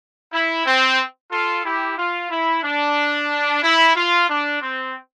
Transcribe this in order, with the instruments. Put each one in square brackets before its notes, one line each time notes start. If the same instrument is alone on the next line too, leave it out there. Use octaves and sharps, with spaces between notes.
[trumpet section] E4
C4
F4 A4
E4 G4
F4
E4
D4
E4
F4
D4
C4